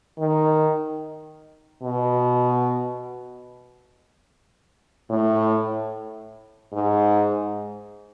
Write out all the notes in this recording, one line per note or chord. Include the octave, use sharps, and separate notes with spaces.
D#3
B2
A2
G#2